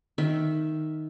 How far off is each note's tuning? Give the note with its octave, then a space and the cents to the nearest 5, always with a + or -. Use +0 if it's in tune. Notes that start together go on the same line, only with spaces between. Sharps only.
D#3 +0 E5 +0